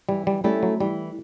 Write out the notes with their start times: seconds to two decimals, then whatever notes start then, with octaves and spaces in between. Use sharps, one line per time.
0.09 E3 G3
0.27 G3
0.44 G3 A3 C#4 E4 A4
0.63 F#3
0.80 E3 G3